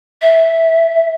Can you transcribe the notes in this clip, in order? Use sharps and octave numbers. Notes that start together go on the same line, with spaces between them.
E5